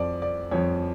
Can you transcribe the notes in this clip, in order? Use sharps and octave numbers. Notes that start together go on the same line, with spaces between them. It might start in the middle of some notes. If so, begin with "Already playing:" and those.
Already playing: F2 F3 D5
D5
F2 F3 C#5